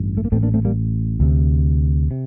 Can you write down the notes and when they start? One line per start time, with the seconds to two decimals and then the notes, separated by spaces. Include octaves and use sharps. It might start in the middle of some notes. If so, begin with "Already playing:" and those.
Already playing: A1 G2
0.17 A3
0.25 A#3
0.32 A1 A2 A3 C4
0.43 A#3 D4
0.54 A3 C4
0.65 G3 A#3
1.20 D2 C3
2.11 C3